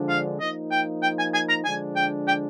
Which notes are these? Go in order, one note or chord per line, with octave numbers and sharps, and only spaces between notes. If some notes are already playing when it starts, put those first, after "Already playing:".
Already playing: D3 F3 G#3 D4
F5
F3 A#3 D#4 D#5
G5
G5
G#5
G#5
A#5
D3 F3 G#3 D4 G#5
G5
G5